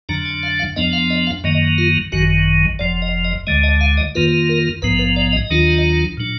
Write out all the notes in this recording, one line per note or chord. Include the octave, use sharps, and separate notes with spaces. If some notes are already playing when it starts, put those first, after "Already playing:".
F2 D3 F#3 D4 A#5
G#5
F5
F5
F2 F3 B3 D4 D#5
F5
D#5
F5
F#2 D#3 F#3 A#3 D#5
F4
G#1 F#2 D#3 F#3 F#4
F#1 F2 F3 D5
D#5
D#5
D2 D3 G#3 D#5
D#5
F5
D#5
F2 D#3 A#3 F4 B4
A#4
A#1 G#2 F3 B3 B4
B4
D5
D#5
D#2 D#3 F#3 D4 F4
A#2 F#3 D4